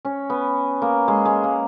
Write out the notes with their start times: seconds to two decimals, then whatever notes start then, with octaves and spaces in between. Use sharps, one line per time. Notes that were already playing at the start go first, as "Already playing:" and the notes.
0.05 C#4
0.30 B3
0.82 A#3
1.08 G#3
1.25 G#3
1.44 A#3